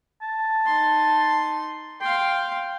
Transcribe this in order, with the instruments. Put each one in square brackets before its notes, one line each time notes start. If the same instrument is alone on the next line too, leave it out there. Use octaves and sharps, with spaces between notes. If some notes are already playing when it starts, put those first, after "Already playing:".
[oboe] A5
[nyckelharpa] D#4 C6
[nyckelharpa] F5 C6 [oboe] G5